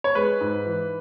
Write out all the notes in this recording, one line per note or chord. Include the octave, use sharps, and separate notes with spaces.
C#5
G#3 B4
G#2
E3